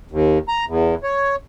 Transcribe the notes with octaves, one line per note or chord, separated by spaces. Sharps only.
D#2
A#5
E2
C#5